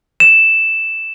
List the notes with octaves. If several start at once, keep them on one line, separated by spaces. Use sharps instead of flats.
E7